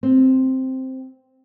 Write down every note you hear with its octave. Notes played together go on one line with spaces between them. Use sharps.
C4